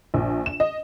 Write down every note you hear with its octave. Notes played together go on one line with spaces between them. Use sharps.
A#1
E7
D#5